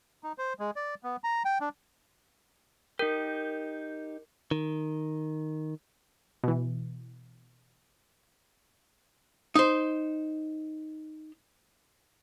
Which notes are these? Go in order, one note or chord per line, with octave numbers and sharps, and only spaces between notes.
D#4
C5
G#3
D5
B3
A#5
G5
D4
D#4 G4 A#4
D#3
B2 E3
D#4 C5